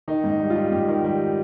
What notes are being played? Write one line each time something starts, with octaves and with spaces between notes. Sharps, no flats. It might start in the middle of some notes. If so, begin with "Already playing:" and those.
D#3 D#4
G#2
D#4
G3
F4
G3
G#2 G4
D#3
G3